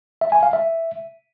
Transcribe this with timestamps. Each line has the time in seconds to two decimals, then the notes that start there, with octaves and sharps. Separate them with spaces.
0.21 E5
0.32 G#5
0.43 F5
0.53 E5